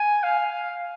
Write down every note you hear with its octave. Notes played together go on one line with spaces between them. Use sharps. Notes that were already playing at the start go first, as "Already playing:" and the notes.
Already playing: G#5
F5